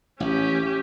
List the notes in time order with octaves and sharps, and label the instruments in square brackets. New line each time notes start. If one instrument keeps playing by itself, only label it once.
[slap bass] A1 [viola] C#4 G4